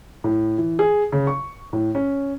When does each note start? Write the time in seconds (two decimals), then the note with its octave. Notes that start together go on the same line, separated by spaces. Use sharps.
0.24 A2
0.58 E3
0.79 G#4
1.12 C#3
1.27 C#6
1.73 A2
1.95 C#4